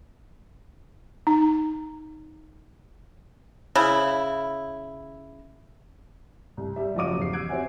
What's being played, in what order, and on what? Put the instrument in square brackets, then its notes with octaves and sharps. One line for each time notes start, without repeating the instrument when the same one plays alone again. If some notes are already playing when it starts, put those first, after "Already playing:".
[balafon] D#4
[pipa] C#3 E4
[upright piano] C2
G3 G4 E5
F#1 F3 F#3 D#5 D6 D#7
E2 C7
E6 F#6 G#6 D7
C4 F#4 C#5 E5 F#5 G#5